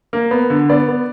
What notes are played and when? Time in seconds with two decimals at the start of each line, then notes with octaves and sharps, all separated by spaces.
0.13 A#3
0.31 B3
0.50 D3
0.69 B3 D5
0.88 B3